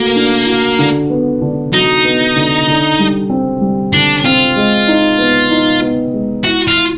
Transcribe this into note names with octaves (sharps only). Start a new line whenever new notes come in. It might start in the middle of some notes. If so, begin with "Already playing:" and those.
Already playing: A3 A#3 F#4
D4
F#4
D3
B3
D3
F#3 D#4
B3
D3
D3
G3
C4
G3
D3 D4
C4 F4
G#3
D#4
B3
D#4
B3
G#3
E4 F#4
F4
E4